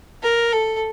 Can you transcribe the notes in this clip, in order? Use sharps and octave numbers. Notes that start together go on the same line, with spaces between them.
A#4
A4